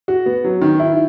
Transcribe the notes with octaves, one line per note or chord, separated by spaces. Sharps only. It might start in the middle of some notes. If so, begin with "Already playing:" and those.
F#4
B3
F#3
D#3
E4